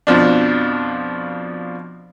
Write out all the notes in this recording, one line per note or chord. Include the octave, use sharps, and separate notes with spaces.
F2 B2 F3 D4